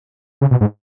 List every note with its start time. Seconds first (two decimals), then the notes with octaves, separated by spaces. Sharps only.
0.41 C#3
0.51 B2
0.61 G#2